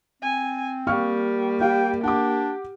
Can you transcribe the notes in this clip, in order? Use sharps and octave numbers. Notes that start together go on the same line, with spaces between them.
C4 G#5
G3 A#3 F5 C#6 F6
G4 F5 G5
D4 G4 F#5 D6